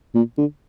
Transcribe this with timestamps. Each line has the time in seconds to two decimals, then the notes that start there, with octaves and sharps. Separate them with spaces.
0.15 A#2
0.38 D3